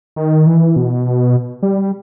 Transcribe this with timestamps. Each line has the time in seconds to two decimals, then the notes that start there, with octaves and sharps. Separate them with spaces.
0.16 D#3
0.47 E3
0.76 B2
1.63 G3